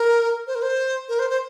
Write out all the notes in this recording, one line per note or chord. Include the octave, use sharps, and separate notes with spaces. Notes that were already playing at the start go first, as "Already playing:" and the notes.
Already playing: A#4
C5
A#4
C5
A#4
C5
C5